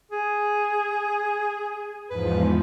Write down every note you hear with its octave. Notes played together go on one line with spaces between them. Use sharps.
G#4
E2 G#2 F3 B4